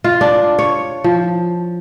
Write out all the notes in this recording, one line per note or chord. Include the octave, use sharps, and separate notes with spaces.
F4
D4
C#5
F3